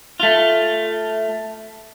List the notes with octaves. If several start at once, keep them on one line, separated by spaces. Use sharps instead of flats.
A3 F4